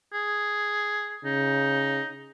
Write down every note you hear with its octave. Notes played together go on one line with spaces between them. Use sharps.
G#4
C#3 D#4